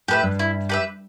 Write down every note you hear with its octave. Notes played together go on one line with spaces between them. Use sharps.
A2 G4 B4 E5
G2
E4
G4 B4 E5